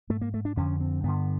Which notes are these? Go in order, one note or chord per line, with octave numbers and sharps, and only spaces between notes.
G#2 A3
A#3
A3
D4
F2 D3 C#4
C4
G2 D3 B3